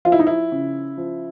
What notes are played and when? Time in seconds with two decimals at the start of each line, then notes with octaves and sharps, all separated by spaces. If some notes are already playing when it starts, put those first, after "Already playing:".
0.05 F3 F4
0.12 E4
0.19 D#4
0.27 E4
0.52 C#3
0.97 F3